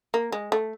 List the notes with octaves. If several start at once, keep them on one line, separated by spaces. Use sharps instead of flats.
A#3
G#3
A3